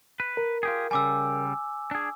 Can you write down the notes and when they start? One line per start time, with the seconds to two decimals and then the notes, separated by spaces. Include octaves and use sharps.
0.20 B4
0.37 A#4
0.63 F4 G4 G#4
0.91 C#3 G3 G#5 D6 E6
1.91 D4 G#4